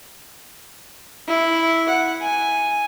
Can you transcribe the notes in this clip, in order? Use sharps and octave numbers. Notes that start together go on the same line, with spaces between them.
E4
F#5
G#5